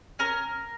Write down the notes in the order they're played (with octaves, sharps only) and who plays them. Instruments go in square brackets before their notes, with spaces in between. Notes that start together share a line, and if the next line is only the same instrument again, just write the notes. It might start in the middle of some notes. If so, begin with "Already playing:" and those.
[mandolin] C#4 A#4